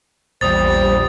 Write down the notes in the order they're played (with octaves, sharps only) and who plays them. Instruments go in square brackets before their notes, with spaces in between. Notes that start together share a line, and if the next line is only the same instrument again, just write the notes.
[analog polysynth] A#1 E2 G3 [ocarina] C5 [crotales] D#6 A6